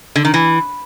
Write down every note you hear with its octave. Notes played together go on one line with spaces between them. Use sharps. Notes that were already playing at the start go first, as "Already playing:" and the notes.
D3
D#3
E3